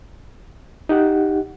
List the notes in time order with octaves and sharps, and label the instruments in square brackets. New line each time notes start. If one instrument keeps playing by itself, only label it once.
[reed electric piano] D#4 G4 F#5